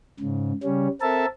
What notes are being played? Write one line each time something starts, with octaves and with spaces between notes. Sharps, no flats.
G#2 C#3
C#3 G3 C#4
C4 A4 A#4 E5 A5